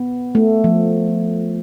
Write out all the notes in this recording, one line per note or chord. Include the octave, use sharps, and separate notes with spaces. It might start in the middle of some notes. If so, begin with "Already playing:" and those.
Already playing: B3
A3
F3